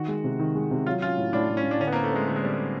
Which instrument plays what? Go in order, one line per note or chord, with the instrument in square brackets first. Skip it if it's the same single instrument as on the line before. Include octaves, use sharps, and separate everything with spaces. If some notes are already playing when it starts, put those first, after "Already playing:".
Already playing: [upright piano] D#3 [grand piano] F#4
[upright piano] G#3
C3
D#3
G#3
C3
[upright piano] F#3 [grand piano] F4
[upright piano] C#4 [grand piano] F4
[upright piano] A2
[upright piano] A2 [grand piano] D4
[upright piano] A2
[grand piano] C#4
[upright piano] A2
[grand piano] D4
[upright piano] D3 [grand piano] C#4
[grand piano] B3
A#3
[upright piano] C4
[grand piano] A3
[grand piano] G#3 [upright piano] C4
[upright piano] D3 [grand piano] A3
[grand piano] G#3
[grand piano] G3 [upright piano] C4
[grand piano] G#3